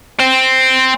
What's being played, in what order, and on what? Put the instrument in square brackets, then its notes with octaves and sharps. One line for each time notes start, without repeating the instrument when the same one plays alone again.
[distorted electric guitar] C4